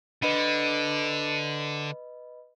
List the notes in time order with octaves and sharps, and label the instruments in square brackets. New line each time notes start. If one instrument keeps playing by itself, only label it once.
[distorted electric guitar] D3 [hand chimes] B4 D#5 B5